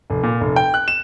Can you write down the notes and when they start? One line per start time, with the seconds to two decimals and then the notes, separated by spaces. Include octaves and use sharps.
0.10 F1
0.23 A#2
0.41 F1
0.56 G5
0.74 F#6
0.88 E7